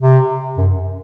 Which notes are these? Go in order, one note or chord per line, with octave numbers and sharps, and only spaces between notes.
C3
F#2